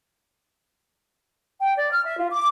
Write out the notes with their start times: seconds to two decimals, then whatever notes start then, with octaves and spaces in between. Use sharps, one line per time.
1.62 G5
1.76 D5
1.92 F6
2.05 E5
2.18 F4
2.31 D6